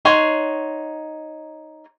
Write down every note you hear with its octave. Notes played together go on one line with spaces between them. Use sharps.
D#4 C#5 F#5 C6